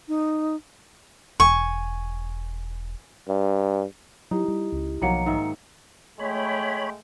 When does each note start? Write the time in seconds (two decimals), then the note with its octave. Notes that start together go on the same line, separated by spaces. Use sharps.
0.08 D#4
1.40 E1 G#5 C#6
3.28 G2
4.31 F#3 D#4 E4 G4
4.48 G3
4.72 C#2
5.02 B1 D#3 F3 F#3 A#3 A#5 C#7
5.26 G#2 D#3 E5
6.19 G#3 A3 C#5 G5 B5